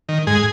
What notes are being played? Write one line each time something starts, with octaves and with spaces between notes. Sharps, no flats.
D#3
G#2 G#4